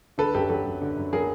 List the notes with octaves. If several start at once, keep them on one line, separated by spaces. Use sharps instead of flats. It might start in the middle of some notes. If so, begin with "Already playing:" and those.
D3 A4 B4
F#2 G4 A4
F#3 G4 A4
F#2
D3
F#2
F#3 G#4 A#4